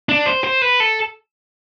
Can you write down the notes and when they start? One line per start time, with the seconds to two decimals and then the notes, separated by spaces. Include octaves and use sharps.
0.09 D4
0.26 C5
0.44 C5
0.62 B4
0.80 A4